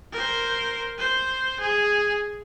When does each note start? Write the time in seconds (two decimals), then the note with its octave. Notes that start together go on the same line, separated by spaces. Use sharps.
0.13 A#4 C5
0.99 C5
1.60 G#4